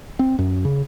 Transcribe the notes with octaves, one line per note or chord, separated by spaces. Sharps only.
C4
F#2
C#3